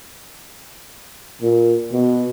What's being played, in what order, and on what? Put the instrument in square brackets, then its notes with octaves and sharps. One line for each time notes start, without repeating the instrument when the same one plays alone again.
[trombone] A#2
B2